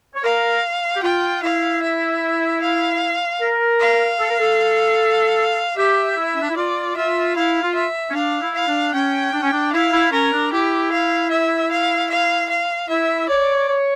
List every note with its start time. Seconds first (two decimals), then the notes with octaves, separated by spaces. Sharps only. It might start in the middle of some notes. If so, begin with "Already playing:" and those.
0.15 C#5
0.24 A#4 F5
0.95 G4
1.03 F4 G5
1.42 E4 F5
1.82 E5
2.61 F5
3.41 A#4
3.80 F5
4.19 A4
4.30 A#4
4.40 A4
5.77 G4 E5
6.17 E4
6.34 C#4
6.42 D4
6.49 E4
6.57 F4 D5
6.96 F4 E5
7.35 E4 F5
7.62 F4
7.75 E5
8.10 C#4
8.14 D4 F5
8.41 E4
8.54 F5
8.68 D4
8.94 C#4 G5
9.33 D4
9.42 C#4
9.52 D4
9.73 E4 F5
9.92 E4
10.12 C#4 A#4
10.33 D4
10.52 E4 G4
10.92 F5
11.31 E5
11.71 F5
12.10 F5
12.50 F5
12.89 E4 E5
13.28 C#5 D5
13.69 C#5